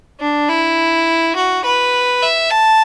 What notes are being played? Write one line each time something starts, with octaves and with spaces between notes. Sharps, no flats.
D4
E4
F#4
B4
E5
A5